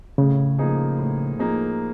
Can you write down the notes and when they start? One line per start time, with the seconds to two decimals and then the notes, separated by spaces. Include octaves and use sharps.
0.18 A2 C#3
0.58 F3 A#3 D#4 G#4
0.99 A2
1.39 F3 A#3 D#4 G#4